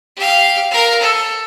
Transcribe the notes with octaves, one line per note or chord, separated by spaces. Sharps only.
G4 F5
A#4 F5
A4